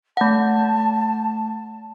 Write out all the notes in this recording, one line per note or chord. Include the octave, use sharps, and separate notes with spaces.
A3 F#5 A5